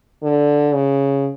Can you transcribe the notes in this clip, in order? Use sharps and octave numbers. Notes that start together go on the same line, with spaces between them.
D3
C#3